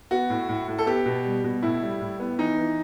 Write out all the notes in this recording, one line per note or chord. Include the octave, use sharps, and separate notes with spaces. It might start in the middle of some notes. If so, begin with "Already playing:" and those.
B3 F#4
A2
A2
A2
A4
B3 G4
B2
G3
B2
A2 E4
G3
A2
B3
E3 D#4
E3